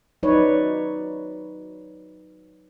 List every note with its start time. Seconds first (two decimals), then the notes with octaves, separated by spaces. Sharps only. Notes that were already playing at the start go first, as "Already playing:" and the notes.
0.23 F#3 D#4 B4 C#5 D5